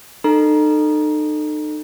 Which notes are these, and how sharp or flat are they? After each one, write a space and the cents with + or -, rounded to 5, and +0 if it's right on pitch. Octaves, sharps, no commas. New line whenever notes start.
D#4 -35 A4 +10 A#5 +20